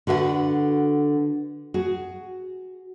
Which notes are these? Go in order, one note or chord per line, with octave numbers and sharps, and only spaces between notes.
D3 F#4 B4 E5 F#5
F#4 G#4